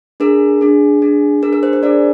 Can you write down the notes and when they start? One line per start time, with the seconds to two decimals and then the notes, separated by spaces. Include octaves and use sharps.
0.20 D4 G#4 A#4
0.61 D4 G#4
1.02 D4 G#4
1.42 D4 G#4 A#4
1.53 A#4
1.63 C5
1.73 C5
1.83 D4 G#4 A#4 D5